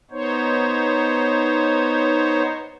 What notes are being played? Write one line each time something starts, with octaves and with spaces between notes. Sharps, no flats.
B3 D#4 C5 C#5